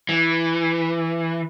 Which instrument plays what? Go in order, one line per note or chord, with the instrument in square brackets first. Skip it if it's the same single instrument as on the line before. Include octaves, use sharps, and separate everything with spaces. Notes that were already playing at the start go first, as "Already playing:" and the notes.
[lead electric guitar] E3